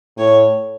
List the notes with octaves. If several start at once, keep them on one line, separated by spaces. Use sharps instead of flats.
A2 C#5